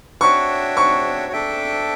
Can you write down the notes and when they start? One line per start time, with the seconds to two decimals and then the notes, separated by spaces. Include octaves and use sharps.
0.21 D4 F#4 C#5 E5 G5 C#6
0.77 C#6
1.33 D4 A4 E5 G5